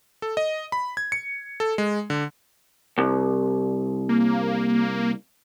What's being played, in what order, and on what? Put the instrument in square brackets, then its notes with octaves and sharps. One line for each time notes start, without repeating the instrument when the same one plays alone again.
[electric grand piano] A4
D#5
B5
G#6
C#7
A4
G#3
D3
[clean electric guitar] C2
[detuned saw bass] A#3